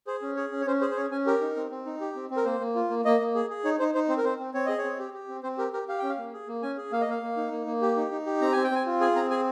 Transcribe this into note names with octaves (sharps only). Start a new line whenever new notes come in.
G#4 C5
C#4
G#4 C#5
C#4
C#5
C#4 C5
G#4 C5
C5
C#4 C#5
C#4 G#5
G4 A#4
D#4
C4
C4
D#4
G4
C4
C4
A#4
A#3 C5
A#3
F4
A#3
A#3 D#5
A#3
G#4
G#4
D#4 C#5
D#4 C5
D#4 C5
C4 C5
A#4
C4 C5
C4
C4 C#5
G#4 D#5
C#5
C4
G4
G4
C4
C4 C5
G4 A#4
G4 A#4
G4 F5
C#4 G5
F5
A#3
G#4
A#3
C#4 G#5
G#4
A#3 F5
D#5
A#3 F5
A#3
D#4
A#3
A#3
G4
D#4
D#4
G4
C4 A#5
C4 G#5
G5
C4 G#5
F4
G#4 G#5
C4 A#5
G#4 G#5